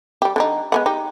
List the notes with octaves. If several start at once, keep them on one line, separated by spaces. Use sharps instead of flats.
G3 G4
D3 G3 D#4
G#3 B3 F#5
D#4 G4